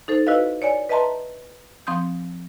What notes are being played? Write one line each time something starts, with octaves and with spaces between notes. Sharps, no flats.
D#4 A4 C5
E4 F#4 B4 D#5 F5
C#5 D5 G#5
B4 D#5 E5 A5 A#5 C6
F3 C4 C6 D#6 G6